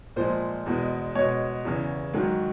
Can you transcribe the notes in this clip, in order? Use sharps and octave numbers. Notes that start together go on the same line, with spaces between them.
A#2 F3 G#3 C5
E2 B2 G#3
B2 G#3 C#5
E2 C#3 E3
G#2 D#3 F#3